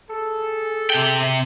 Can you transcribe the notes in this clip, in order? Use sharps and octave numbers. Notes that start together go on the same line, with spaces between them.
G#4 A4
C3 G5